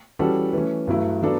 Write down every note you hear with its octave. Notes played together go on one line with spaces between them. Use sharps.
E3 G3 C#4 F#4 A4
E3 A3 C#4
G2 F#3 A3 E4
F#3 B3 D4 A4